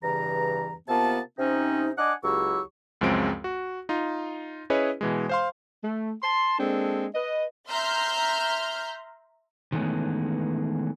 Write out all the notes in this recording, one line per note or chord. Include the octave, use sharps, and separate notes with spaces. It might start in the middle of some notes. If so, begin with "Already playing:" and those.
E2 G2 C#3 E3 A#5
C3 A#3 B3 F4 A5
C3 C4 C#4 D#4
D4 D#5 F#5 G#5 D6
C#2 F#3 E4 G4 C#6 E6
C#2 F#2 F3 G#3 C4 D7
F#4
D#4 F4
C#4 E4 G#4 B4 C#5 D#5
B2 E3 G#3
C5 F5 C6
A3
A5 C6
G#3 A#3 C4 D4 A4
B4 D#5
E5 A#5 C6 F6 G6
D#3 E3 G#3 A3 B3 C#4